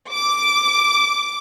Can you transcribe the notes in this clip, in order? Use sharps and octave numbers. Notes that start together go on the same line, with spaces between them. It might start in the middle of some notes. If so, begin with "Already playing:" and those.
D6